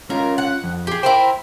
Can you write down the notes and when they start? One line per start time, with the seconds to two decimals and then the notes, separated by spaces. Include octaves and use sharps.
0.10 C#4 F4 A#4
0.38 F#5
0.64 F2
0.87 G4 G#4
1.03 E4 A#4 C5 G5